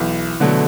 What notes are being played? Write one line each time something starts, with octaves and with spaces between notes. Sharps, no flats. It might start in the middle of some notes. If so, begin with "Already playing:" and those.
Already playing: B1 E3
B2 D3 F#3 A3